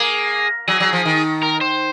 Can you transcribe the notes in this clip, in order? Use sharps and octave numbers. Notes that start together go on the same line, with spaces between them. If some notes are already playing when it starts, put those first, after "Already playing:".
Already playing: A#3 G#4
F#3 G#4
F#3
F3
D#3
A#4
C5